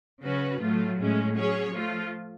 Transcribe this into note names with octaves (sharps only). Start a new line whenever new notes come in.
C#3 F#3 C#4 F#4 B4
A2 F#3 A3 F4
A2 G#3 C#4
F#3 C#4 G#4 C#5
F3 A3 F4